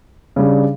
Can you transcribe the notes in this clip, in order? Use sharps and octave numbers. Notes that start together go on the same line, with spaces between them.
C#3 G3 D4